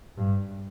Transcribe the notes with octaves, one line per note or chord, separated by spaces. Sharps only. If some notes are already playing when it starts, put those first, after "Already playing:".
G2